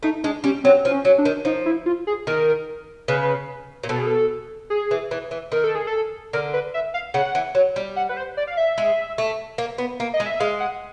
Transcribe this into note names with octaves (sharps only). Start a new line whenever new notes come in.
A3 D#4
G#3 D4
G3 C#4
F#3 C4
F3
C#4
F#3
D4
D#3
F3 D#4
E4
F4
G#4
D#3 A#4
C#3 B4
A#2
B2 A4
G#4
A4
G#4
E3
E3
E3
D#3 A#4
A4
G#4
A4
D3 A#4
B4
E5
F5
C#3 F#5
E3
F#3
G3
F#5
B4
C5
D5
F5
E5
G#3
A3
A#3
B3
A#3
D#5
G#3
E5
G#3 F5
F#5